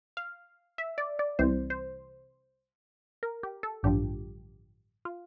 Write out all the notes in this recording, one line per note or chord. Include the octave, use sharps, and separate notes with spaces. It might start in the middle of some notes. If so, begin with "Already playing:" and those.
F5
E5
D5
D5
C2 C3 E3 C5
C5
A#4
G4
A4
A1 G2 D3 F3 G4
F4